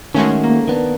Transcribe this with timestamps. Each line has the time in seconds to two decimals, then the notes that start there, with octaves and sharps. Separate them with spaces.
0.15 D#3 G#3 A3 C#4 F#4
0.43 A#3
0.68 D#3 B3 D4